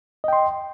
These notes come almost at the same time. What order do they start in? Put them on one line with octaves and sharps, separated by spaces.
D#5 G5 C6